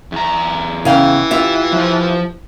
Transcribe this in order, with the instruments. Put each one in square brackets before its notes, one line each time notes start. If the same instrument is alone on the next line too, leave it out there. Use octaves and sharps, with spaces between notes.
[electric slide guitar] E2 A#5
[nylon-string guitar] C#3 F5 G5 [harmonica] E3
[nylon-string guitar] F4 G4 E5
[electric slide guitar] F3 C5